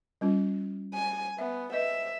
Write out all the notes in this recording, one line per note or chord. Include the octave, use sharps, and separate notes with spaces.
G3 C#4 F4
G#5
B3 E5
B4 D#5 E5